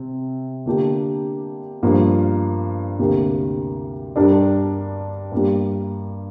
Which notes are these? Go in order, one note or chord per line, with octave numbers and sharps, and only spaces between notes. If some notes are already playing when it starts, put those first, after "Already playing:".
Already playing: C3
D3 A#3 D4 G4
G2 F3 A#3
D2 C3 A#3 G4 A#4
G2 G3 D4 A#4 D5
G2 G3 A#3